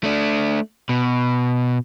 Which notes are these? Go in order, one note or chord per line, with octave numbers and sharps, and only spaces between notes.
A3 D4
B2